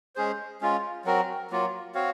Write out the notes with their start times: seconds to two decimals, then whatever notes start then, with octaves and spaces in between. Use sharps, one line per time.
0.16 G#3 C#4 G#4 C5
0.61 G#3 C#4 F4
1.05 F#3 C4 F#4 A#4
1.50 F#3 A#3 F4
1.95 C4 F#4 C#5 F5